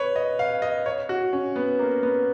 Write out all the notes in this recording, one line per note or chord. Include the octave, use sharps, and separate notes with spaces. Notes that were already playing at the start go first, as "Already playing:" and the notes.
Already playing: B4 C#5
D#5
F5
D#5
C#5
F#4
C#4
B3
A#3
B3